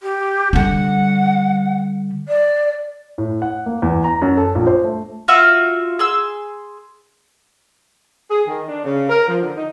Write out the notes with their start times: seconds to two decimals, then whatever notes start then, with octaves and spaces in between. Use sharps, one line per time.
0.02 G4
0.53 D3 G3 F#5
2.28 D5
3.18 A2
3.42 F#5
3.66 A#3
3.82 E2
4.04 A#5
4.22 F#2
4.37 A4
4.55 A#1
4.67 C5
4.84 A3
5.28 F4 F#4 E5
5.99 G#4 C6 E6
8.31 G#4
8.47 D#3
8.69 D4
8.85 C#3
9.09 A#4
9.28 F3
9.42 D3
9.57 D#4